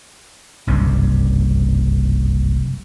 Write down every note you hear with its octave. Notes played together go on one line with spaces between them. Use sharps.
F#1 C2 G2 C3